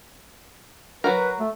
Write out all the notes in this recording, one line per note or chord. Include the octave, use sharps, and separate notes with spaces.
F#3 F#4 A#4 B4
A3